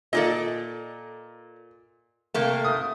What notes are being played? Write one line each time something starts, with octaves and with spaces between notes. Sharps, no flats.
A#2 A4 D5 D#5
C3 A3 A#3
D#6